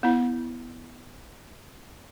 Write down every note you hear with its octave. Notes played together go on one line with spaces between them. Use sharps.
B3 E4